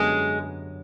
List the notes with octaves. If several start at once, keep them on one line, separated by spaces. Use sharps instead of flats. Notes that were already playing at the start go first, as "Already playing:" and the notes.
Already playing: F#2 D3 G3 G#3 B3